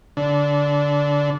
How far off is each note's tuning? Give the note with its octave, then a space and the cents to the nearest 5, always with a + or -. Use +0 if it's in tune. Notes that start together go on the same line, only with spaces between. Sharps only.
D3 -20